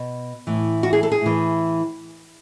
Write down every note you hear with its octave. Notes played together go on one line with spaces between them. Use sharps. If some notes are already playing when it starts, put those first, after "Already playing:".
Already playing: B2
A2 E3
F#4
G#4
A4
G#4
A2 E3